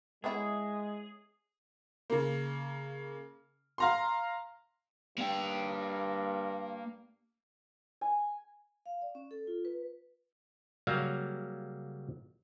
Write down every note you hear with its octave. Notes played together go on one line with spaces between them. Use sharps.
G#3 B3 C#4 E4 G#4
C#3 A#3
F5 A#5 C6
G2 A#3 G5
G#5
F5
D5
C#4
A4
F4
B4
C#3 F#3 G3 A#3 F5